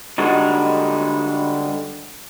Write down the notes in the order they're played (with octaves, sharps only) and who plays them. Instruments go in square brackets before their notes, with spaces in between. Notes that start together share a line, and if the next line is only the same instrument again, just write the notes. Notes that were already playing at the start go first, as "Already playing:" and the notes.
[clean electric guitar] D3 G3 G#3 D#4 F#4